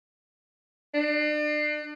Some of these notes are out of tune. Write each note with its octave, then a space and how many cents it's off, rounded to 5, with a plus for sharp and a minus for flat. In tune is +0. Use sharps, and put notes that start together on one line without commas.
D4 +35